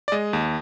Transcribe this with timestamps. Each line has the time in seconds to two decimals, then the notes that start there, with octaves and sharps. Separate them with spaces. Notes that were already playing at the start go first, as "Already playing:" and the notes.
0.08 D5
0.12 G#3 D#5
0.33 D#2